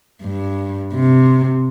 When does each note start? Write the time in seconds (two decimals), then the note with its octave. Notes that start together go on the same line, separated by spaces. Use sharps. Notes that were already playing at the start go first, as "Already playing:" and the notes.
0.23 G2
0.94 C3